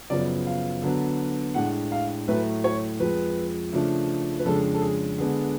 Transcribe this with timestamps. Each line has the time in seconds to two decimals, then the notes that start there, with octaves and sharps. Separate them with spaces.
0.10 F#2 C#3 F3 B3 D5
0.47 F5
0.82 D3 F#3 B3 D4
1.54 A2 G#3 D4 F#5
1.92 F5
2.28 A2 F#3 A3 B4
2.64 C#5
3.00 F2 F3 G#3 B4
3.73 C#3 F3 A3 D4
4.39 B4
4.45 F2 C#3 G#3 D4 A4
4.74 A4
4.82 G#4
5.18 D3 G#3 B3 D4 G#4